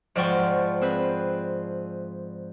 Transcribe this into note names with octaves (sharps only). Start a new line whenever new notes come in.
G#2 F3 D5 F#5 G5 C#6
C4 G#4 B4